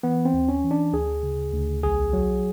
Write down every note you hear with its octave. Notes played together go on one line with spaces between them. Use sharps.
E3 B3
C4
D#2
C#4
E3
D4
D2 G#4
C#3
D2
B1 G#4
F#3